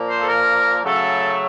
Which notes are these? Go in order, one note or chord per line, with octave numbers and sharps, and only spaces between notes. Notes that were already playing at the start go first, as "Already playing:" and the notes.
Already playing: A#2 F3 A#3
C5
A4
A#4
C#3 F#3 A3 A4